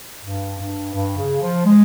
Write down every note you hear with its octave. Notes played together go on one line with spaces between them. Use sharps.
G2
G2
G2
C#3
F3
G#3